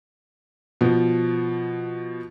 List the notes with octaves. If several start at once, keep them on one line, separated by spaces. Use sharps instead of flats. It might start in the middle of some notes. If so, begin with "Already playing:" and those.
B2 F3